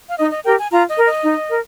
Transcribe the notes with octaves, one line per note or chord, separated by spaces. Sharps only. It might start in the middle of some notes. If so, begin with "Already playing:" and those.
F5
D#4 D#5
D#5
G4 A#4 G5
G#5
F4 A#5
D#5
A#4
D#5
D#4
A#4